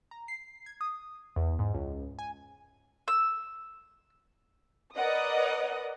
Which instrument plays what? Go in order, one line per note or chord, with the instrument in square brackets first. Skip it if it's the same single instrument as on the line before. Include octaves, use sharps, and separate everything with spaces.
[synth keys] A#5
C7
G#6
D#6
E2
G#2
C#2
G#5
[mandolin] E6
[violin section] A#4 B4 D5 D#5 F#5 D#6